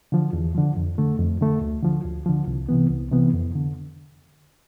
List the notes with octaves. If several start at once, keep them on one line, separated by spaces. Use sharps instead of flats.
D3 F3
E2
D3 F3
F2
D3 A3
F2
D3 A3
D2
D3 F3
D2
D3 F3
C2
C3 E3 B3
C2
C3 E3 B3
F2
D3